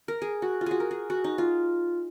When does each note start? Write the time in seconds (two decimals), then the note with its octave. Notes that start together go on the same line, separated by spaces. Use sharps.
0.08 A#4
0.22 G#4
0.42 F#4
0.61 F4
0.66 F#4 G#4
0.80 A#4
0.91 G#4
1.10 F#4
1.24 D#4
1.38 F4